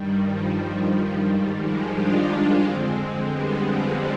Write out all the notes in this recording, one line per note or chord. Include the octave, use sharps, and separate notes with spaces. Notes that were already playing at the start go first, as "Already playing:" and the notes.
Already playing: G2 D#3 G3
F3
G3
G#2 D#3
F3 G#3
D4 F4
F2 D3 G#3 C4
G#3 C4
G3 B3
F3 G#3